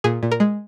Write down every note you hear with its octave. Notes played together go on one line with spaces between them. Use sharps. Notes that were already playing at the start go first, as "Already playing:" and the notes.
A#2 G#4
A#2
A#4
G#3